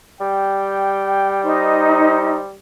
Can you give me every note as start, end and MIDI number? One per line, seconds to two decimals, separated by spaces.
0.21 2.55 55
0.21 1.43 79
1.44 2.36 63
1.44 2.46 72